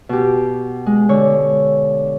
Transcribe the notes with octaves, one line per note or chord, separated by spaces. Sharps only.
B2 G4
G#3
D3 C#5